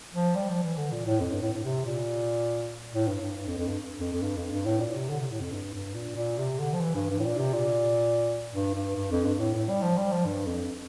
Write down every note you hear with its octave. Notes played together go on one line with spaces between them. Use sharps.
F3
G3
F3
E3
D3
A#2
A2
F2
G2
A2
A2
C3
A#2
A2
G2
G2
G2
F2
F2
G2
F2
F2
G2
F2
G2
A2
A#2
C3
D3
C3
A2
F2
G2
G2
A#2
A#2
C3
D3
F3
E3
G2
G2
A2
A#2
C3
A#2
G2
G2
G2
F2
G2
A2
A2
G3
F3
G3
F3
G2
F2